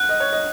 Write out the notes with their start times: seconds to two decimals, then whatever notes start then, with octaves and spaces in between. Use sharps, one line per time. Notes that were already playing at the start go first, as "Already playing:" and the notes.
Already playing: F#5 F#6
0.09 D#5
0.20 C#5
0.33 D#5